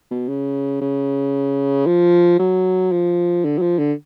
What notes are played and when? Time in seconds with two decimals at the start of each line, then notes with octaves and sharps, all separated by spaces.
0.11 B2
0.29 C#3
0.81 C#3
1.86 F3
2.39 F#3
2.92 F3
3.45 D3
3.58 F#3
3.62 F3
3.79 D3